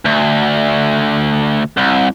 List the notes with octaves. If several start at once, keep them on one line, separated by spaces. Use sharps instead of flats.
D2
C2